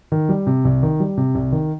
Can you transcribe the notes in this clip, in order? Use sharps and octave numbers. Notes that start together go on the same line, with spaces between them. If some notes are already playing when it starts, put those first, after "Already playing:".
D#3
G3
C3
C2
D#3
G3
C3
C2
D#3